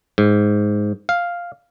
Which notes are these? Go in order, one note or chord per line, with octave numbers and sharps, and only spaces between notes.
G#2
F5